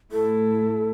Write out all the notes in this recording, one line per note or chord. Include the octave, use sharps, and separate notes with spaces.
A2 A3 E4 A4